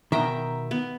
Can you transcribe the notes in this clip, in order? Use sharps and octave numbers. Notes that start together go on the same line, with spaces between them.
B2 D#3 E5 G5 A#5
B3